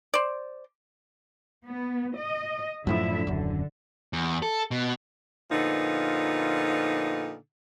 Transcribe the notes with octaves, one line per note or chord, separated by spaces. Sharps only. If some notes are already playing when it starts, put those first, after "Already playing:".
C5 D5
B3
D#5
F#2 A2 D3 F3 E4 E5
D#1 F#2 D3
E2
A4
B2
A#2 D3 F3 B3 D#4